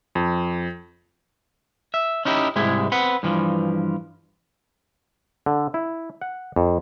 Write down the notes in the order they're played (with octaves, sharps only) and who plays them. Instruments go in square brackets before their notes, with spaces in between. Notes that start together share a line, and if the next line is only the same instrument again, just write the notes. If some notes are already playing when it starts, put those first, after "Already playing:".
[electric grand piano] F2
[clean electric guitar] E5
C#4 D#4 E4 G4
C2 G#2 G#3 E4 G4
C4 B4 F#5
G2 E3 F3
[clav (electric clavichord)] D3
E4
F#5
F2